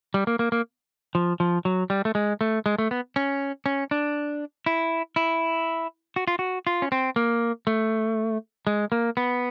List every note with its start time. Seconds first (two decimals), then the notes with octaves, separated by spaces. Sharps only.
0.14 G3
0.27 A#3
0.39 A#3
0.52 A#3
1.15 F3
1.40 F3
1.65 F#3
1.90 G3
2.05 A3
2.15 G#3
2.41 A3
2.66 G#3
2.78 A3
2.91 B3
3.16 C#4
3.66 C#4
3.91 D4
4.66 E4
5.16 E4
6.16 F#4
6.28 F4
6.39 F#4
6.67 F4
6.82 C#4
6.92 C4
7.16 A#3
7.67 A3
8.67 G#3
8.92 A#3
9.17 B3